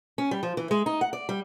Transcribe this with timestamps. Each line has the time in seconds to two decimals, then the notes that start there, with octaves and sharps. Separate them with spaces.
0.18 C#4
0.31 G3
0.43 F3
0.57 E3
0.71 G#3
0.86 D#4
1.01 F#5
1.13 D5
1.29 G3